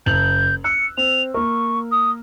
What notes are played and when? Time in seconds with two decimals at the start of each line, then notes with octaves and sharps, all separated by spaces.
0.06 F#1 G6 F7 F#7
0.64 E6 F#6 C#7
0.97 C4 F7
1.34 A#3 A#4 C#6
1.92 D#6